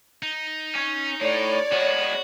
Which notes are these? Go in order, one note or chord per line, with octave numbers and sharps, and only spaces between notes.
D#4
C#4
A2 C#5 D5
G#3 B3 F#4